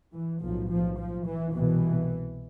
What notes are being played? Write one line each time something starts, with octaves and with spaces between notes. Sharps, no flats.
E3
B1 A2 F3
F3
F3
E3
C2 B2 E3